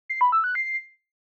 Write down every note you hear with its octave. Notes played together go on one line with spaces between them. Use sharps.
C7
B5
E6
F#6
C7